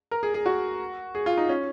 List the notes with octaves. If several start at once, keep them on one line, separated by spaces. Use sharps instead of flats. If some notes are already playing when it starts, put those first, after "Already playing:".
A#4
G#4
G#4
F#4
G#4
F4
D#4
C#4